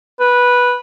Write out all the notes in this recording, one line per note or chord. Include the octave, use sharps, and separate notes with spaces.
B4